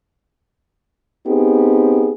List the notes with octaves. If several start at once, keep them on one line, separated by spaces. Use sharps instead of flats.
B3 C4 D#4 G4 G#4